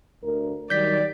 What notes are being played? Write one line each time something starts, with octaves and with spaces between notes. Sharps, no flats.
D2 A#4
D#3 F#3 G3 D5 G6 B6